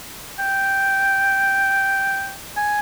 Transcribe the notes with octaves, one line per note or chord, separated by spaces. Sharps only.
G5
G#5